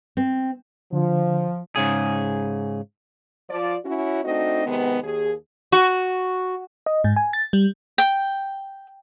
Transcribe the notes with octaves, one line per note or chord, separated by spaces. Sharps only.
C4
D3 F3
G#2 C#3 G#4
F3 D5
C#4 E4 F#4
A3 C4 D4 D#4 F#4 D#5
C3 D#3 G#3 B3
D#2 G#4
F#4
D#5
G#2
G#5
A6
G3
G5